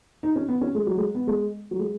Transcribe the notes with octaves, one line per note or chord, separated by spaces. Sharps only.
D#4
C#4
B3
C#4
G#3
F#3
G#3
B3
G#3
F#3
G#3